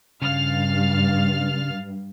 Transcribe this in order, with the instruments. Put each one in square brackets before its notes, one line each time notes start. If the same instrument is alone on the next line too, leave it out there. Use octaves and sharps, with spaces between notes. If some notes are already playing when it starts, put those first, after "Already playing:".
[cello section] G2 [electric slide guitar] C#3 [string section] F5 F6 A6